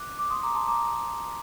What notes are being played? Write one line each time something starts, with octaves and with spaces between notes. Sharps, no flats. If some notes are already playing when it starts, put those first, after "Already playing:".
Already playing: D6 F#6
D6
C6 D#6
A#5 D6
A5 C6
A#5 D6